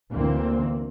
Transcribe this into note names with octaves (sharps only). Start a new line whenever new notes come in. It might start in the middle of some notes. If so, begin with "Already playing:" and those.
D2 D3 E3 A#3 C4